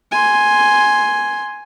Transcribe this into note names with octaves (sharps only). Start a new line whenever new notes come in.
G#5 C6